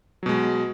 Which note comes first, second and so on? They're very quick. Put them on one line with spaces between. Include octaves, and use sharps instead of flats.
F#3 B2 G#3